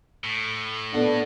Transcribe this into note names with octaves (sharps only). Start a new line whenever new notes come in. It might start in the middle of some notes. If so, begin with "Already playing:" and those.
A2
A#2 B3 D4 A4 F#5